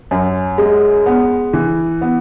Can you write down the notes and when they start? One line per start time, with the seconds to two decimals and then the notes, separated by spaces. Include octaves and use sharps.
0.11 F#2
0.58 G#3
1.06 B3
1.53 E3
2.01 B3